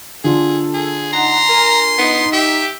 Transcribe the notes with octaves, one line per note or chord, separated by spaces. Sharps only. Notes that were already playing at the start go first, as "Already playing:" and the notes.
D3 F4 G#4 A4
G#4
D#4 F#5 A#5 C6
A#4 G#5
B3 D#4
G4 E5